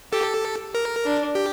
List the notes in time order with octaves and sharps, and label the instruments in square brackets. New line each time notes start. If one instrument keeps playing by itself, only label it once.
[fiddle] G4 [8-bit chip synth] A4
[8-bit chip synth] A#4
[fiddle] D4
[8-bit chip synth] G4